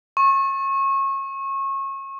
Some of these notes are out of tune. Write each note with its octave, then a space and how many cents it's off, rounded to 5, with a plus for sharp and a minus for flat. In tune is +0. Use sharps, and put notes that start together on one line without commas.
C#6 -30